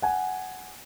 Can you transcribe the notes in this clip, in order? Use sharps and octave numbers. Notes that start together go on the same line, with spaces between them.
F#5 G#5